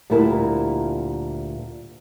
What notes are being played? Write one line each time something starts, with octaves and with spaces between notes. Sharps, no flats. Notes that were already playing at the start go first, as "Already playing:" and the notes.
D2 A#2 G3 E4 A#4 A5